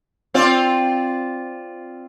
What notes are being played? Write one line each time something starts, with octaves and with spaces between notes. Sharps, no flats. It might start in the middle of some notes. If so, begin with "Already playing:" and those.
C4 F4 D5